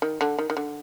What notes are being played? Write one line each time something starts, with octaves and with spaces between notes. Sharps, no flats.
D#3
D3
D#3
D#3
D3